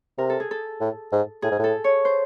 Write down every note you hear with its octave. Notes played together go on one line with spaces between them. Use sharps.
C3 A#4
A4
G#4
A4
A2
G#2
A2 G#4
G#2
A2 A4
C#5
C5